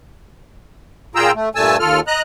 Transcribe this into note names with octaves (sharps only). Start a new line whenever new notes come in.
A#2 F4 G#4 G5 A#5 E6
A3
G2 A#2 A3 G#5 A5 E6
D#2 F4 A4 F6
D#5 A#5 F#6